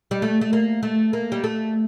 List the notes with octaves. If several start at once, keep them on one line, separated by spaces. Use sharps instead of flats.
G3
A3
A3
A#3
A3
A#3
G3
A3